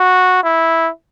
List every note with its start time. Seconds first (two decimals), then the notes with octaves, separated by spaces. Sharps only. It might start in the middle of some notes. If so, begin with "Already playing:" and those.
Already playing: F#4
0.44 E4